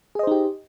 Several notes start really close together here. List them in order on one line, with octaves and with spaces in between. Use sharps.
G#4 D#5 C5 D#4 G4